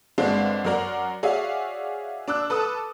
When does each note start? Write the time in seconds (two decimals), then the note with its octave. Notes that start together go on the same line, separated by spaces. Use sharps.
0.18 G1 G#3 C4 D4 F5 F#5
0.65 F#2 F#4 A#4 D5 A#5
1.23 F#4 G#4 C#5 D5 E5 F5
2.28 D4 D6 E6 F#6
2.50 A4 B4 A5 D#6